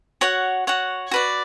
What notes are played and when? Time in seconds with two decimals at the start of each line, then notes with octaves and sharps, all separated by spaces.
0.21 F#4 C#5 F#5
0.67 F#4 C#5 F#5
1.11 F#4 B4 D5